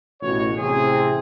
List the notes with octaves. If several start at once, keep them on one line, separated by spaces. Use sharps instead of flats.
A1 B2 F#4 C#5
A1 C3 C4 G#4